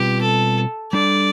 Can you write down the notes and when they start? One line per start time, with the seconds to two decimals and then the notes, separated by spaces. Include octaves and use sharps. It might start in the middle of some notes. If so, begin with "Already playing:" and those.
Already playing: B2 G3 C4 F4 G4 B4
0.22 A4
0.93 G3 D4 A4 D5